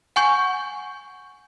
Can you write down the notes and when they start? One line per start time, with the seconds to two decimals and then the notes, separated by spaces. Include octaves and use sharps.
0.16 F#5 G#5 C#6 G6